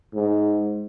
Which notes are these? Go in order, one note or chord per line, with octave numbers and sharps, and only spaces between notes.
G#2